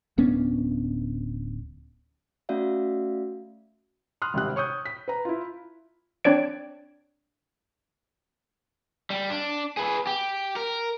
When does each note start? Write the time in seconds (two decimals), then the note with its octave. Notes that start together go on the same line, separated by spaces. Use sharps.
0.18 D1 B3 C#4 D4
2.49 A3 C#4 F#4 D5 E5 F5
4.22 C6 D#6 F6 F#6
4.34 G#1 C3 F#6
4.56 C#5 C#6 D#6 G6
4.86 B6
5.08 B4 A#5
5.25 E4 F4
6.25 C4 D4 C#5 D5 D7
9.10 G3
9.30 D4
9.77 G#4 B4
10.07 G4
10.56 A#4